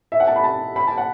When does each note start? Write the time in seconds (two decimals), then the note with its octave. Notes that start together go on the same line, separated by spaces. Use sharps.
0.12 E5
0.20 F#5
0.27 A5
0.36 B5
0.44 A5
0.76 B5
0.87 A5
0.98 F#5